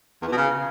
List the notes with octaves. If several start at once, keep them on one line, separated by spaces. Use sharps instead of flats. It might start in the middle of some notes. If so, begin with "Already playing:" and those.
E2
E3
B2
C#3